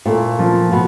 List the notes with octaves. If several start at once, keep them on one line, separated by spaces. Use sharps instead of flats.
A#2 A3
F3
B2